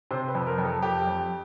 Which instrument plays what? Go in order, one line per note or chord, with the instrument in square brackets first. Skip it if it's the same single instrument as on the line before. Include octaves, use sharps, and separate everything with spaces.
[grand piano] C3 C5
B4
F2
A#4
F2
A4
F2 G4
F2